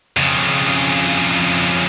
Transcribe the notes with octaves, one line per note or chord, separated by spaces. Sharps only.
F2 C#3